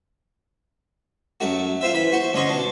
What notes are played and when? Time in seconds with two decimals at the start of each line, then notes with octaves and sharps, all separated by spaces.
1.40 F#2 A3 F#4
1.81 F4 C5 E5
1.94 E3 B5
2.12 F#4 C5
2.33 D2 C#4 D#5 C6 C#6
2.49 B2 D4